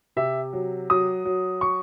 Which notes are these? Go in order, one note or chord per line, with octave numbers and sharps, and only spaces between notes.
C3 E5
F#3
F#3 D#6
F#3
C#6